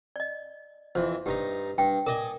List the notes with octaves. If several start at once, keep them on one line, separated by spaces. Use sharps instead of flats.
D5 D#5
F2 E3 C5
G2 D#4 G4 A#5
G2 G5
A#4 D5 D#5 G#5